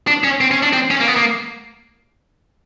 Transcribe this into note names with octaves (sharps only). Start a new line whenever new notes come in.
D4
C#4
C4
C#4
D4
C4
C#4
A#3
B3
A#3